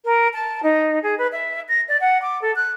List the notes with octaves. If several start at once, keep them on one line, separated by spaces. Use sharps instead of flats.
A#4
A5
D#4
G#4
B4
E5
A#6
D5
F#5
D6
A4
F#6